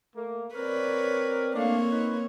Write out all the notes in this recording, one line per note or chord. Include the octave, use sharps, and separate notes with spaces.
A3 A#3
C4 A#4 B4 C#5 D5
A3 A#3 C4 D4 C#5 F5
D#4 B4